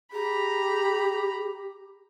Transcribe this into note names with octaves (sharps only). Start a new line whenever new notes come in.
G4 G#4 A#5 B5